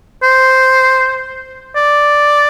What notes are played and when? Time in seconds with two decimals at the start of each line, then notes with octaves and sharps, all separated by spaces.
0.23 C5
1.76 D5